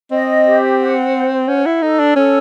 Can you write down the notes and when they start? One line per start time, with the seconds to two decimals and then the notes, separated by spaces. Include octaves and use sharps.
0.11 C4 D#5
0.46 G4
0.79 F#5
1.14 C5
1.48 C#4 F#5
1.66 E4
1.82 D#4 A4
1.99 D4
2.16 C#4 A4